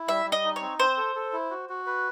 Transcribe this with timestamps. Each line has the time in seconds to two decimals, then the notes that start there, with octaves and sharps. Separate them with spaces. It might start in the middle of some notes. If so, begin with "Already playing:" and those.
Already playing: E4
0.08 G3 E5
0.26 G3
0.32 D#5
0.44 D#4
0.56 C#5
0.61 C4
0.79 C4 C5
0.97 A4
1.15 A4
1.33 E4
1.50 F#4
1.69 F#4
1.86 B4